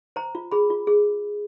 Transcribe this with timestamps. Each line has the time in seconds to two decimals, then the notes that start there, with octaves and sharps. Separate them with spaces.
0.16 C5 A#5
0.35 F4
0.52 G#4 B5
0.70 F4
0.87 G#4